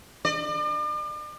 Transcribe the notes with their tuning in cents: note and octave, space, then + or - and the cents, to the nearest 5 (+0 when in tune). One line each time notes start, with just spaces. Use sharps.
D5 +40